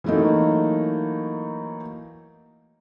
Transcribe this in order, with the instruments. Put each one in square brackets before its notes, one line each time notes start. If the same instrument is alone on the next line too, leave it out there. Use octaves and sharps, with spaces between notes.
[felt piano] E3 F#3 A3 A#3 D#4